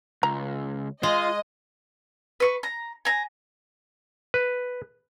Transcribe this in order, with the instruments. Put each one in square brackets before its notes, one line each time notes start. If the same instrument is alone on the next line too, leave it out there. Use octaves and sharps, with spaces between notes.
[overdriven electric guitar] C#2 [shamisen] A#5
[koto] G#3 [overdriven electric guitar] F4 [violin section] D#5
[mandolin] B4 C#6
A#5
G#5 A#5
[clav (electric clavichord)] B4